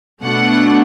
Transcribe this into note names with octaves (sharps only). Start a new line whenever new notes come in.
B2 A3 D4 F#5